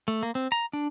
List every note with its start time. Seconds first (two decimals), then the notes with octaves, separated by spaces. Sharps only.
0.08 A3
0.23 A#3
0.35 C4
0.52 A#5
0.73 D4